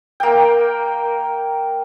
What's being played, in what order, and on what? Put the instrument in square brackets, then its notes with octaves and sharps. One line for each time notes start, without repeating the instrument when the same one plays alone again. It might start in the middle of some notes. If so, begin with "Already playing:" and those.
[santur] A#3 G5